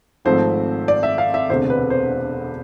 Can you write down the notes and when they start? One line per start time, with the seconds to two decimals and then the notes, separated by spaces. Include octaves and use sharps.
0.25 G#1 G#2 F3 A3 C4 C5
0.88 D5
1.03 E5
1.18 F5
1.34 E5
1.49 E1 D2 C3 C5
1.70 B4
1.90 C5